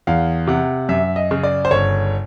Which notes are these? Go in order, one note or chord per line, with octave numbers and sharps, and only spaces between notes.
E2 F5
C3 F#5
F#2 E5
D#5
C#3
D5
C5
G1 C#5